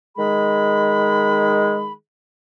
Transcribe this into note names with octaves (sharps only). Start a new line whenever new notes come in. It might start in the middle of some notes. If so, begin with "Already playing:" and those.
D#3 G#3 G#4 B5